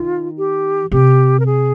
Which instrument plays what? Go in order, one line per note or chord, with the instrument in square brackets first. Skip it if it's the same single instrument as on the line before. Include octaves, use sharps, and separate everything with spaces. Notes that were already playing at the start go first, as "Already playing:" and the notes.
Already playing: [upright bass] D#3 [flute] F4
[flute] G4
[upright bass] C3 [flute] G4
[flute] A#4
G#4